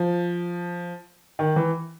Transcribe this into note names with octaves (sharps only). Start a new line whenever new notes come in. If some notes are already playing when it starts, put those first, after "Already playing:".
Already playing: F3
D#3
E3